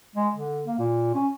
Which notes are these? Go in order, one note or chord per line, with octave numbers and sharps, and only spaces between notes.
G#3
D3
A#3
A#2
C#4